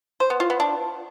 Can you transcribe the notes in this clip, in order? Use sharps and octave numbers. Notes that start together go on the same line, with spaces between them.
C5
B3
F4
B3
D4